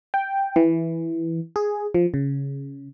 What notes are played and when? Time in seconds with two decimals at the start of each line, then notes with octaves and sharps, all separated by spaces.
0.14 G5
0.56 E3
1.56 G#4
1.94 F3
2.14 C#3